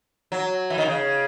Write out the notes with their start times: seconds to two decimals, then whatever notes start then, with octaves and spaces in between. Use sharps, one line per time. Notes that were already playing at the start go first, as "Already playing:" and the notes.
0.32 F#3
0.70 E3
0.78 D#3
0.85 C#3